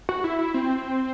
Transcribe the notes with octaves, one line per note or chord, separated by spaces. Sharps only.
F#4
E4
E4
C4